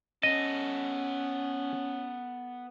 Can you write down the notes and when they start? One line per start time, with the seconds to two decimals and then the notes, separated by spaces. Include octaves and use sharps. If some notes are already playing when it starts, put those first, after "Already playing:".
0.23 B3 C#4 A4 D#5